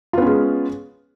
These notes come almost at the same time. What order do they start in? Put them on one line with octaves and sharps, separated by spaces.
F4 B3 C#4 G#3